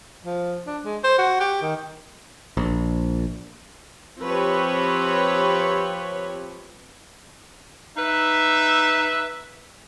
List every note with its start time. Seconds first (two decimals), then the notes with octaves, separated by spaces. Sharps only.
0.25 F3
0.67 D4
0.85 G#3
1.04 C5
1.18 F#4
1.40 G4
1.62 D#3
2.57 A#1
4.21 F3 C4 G4 B4 C#5
7.96 D#4 B4 E5